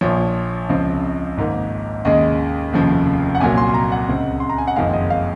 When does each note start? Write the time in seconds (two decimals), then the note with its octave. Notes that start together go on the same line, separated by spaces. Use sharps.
0.01 A#1 A#2 F3 C#5
0.69 C#2 C#3 F3 C4
1.37 G#1 G#2 D#3 A#3
2.05 D#2 C#3 G#3 D#5
2.73 F1 D#2 C#3 F3
3.35 F#5
3.40 C2 A#2 F#3 A#3 G#5
3.58 C6
3.69 C6
3.74 A#5
3.92 F#5
4.08 C#2 C#3 G#3 C4
4.40 C6
4.50 A#5
4.58 G#5
4.68 F#5
4.76 F#1 F2 D#3 G#3 F5
4.93 D#5
5.10 F5